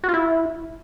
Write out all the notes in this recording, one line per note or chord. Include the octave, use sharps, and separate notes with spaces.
F#4
F4
E4